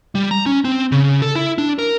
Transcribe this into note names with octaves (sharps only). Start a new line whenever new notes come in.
G3
A#5
C#4
C4
C#3
A4
E4
D4
A#4